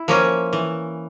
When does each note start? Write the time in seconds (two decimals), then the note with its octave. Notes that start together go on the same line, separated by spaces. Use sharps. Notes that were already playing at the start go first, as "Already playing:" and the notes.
Already playing: E4
0.08 F3 A#3 C#4
0.53 E3